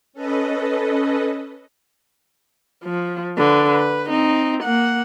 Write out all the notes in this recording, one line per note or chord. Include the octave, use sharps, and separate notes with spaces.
C#4 A4 B4 D#5
F3
D3 B4
B4
C4 D#4
A#3 F#5